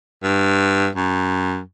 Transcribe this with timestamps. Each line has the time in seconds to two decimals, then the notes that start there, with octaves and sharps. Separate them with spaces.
0.23 G2
0.95 F#2